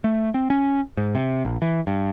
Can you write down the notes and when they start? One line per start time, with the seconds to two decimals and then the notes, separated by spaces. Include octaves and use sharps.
0.04 A3
0.34 C4
0.50 C#4
0.97 G#2
1.15 C3
1.45 A#1
1.62 E3
1.87 G2